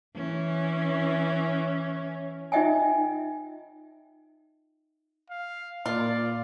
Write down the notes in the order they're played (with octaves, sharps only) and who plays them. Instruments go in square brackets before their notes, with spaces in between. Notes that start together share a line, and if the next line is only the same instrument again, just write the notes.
[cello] E3 C#4
[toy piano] D#4 F4 D#5 E5 G5 G#5
[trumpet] F5
[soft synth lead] A#2 [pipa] F4 [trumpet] D5